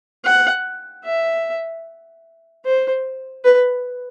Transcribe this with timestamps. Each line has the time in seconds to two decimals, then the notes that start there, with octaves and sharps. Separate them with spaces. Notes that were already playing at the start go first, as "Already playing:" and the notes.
0.25 F#5
1.05 E5
2.65 C5
3.45 B4